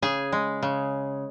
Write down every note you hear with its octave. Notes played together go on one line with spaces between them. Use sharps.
C#3 G#4
G#3
C#3